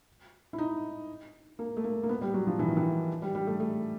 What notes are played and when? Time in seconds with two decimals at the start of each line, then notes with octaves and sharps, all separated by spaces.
0.53 E4
0.58 D#4
1.59 A#3
1.77 A3
1.84 A#3
2.03 A#3
2.09 B3
2.22 G3
2.34 F#3
2.47 F3
2.59 E3
2.68 D#3
2.77 E3
3.22 G3
3.35 G3
3.47 A3
3.60 A3